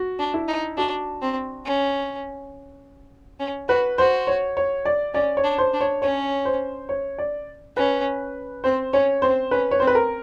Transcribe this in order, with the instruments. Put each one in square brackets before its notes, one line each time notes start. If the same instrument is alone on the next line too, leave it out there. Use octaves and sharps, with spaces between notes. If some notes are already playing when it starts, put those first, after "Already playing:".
Already playing: [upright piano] F#4
[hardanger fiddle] D4
[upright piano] E4
[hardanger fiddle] D#4
[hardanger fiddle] D4 [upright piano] F#4
[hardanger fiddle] C4
C#4
C#4
[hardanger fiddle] F#4 [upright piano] B4
[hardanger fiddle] F#4 [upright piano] C5
[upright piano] C#5
C#5
D5
[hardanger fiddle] C#4 [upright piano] D5
[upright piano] C#5
[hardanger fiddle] D4
[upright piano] C5
[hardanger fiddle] D4
[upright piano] C#5
[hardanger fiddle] C#4 [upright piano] C#5
[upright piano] C5
C#5
D5
[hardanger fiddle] C#4 [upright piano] B4
[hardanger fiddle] C4 [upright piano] C5
[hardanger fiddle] C#4 [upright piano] C#5
[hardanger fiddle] C4 [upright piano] C5
[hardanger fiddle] C#4 [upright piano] B4
[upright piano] C#5
[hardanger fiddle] C4 [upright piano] C5
[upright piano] B4
A#4